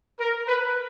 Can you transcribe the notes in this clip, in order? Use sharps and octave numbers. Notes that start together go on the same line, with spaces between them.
A#4
B4